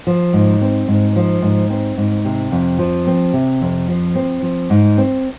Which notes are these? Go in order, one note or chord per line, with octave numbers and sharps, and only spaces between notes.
F3
G#2
C4
G#2
F3
G#2
C4
G#2
C3
F2
F3
C4
C3
F2
F3
C4
F3
G#2
C4